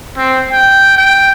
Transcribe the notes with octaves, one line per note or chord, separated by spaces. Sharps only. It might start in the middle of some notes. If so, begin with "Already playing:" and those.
C4
G5
G5